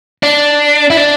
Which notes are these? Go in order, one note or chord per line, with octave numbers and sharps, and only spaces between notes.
D4
E4
D4